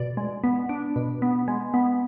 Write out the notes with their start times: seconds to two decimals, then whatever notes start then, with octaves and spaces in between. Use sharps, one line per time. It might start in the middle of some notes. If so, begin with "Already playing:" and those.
Already playing: B2 D5
0.17 G#3
0.44 B3
0.69 D4
0.96 B2
1.22 B3
1.48 G#3
1.74 B3